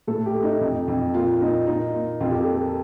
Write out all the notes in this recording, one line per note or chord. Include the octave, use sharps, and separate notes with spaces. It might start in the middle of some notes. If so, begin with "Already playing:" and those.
A2 A4
G4
A3
D#4
F2
F2
A#2 F4
A#2 D#4
A#2 D#4
A#2
F2 F4
G4
A4
A#3
A4